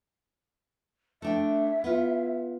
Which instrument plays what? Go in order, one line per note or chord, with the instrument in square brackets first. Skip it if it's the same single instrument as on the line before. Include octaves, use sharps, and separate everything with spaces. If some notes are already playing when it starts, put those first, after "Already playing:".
[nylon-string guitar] A3 D4 G5 [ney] E5
[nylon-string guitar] B3 F4